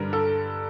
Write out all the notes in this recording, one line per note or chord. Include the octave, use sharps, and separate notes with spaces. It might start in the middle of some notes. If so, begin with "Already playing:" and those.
Already playing: G2 D3 G3 A#4 B4
A4